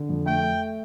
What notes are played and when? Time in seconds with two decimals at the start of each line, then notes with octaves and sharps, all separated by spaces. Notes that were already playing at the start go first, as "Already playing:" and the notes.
Already playing: D3
0.09 F2
0.26 A3 G5
0.43 A3